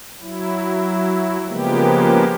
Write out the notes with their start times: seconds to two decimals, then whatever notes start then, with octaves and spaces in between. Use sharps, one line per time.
0.21 F#3 E4
1.47 C#3 F3 G#3 A#3 B3 G4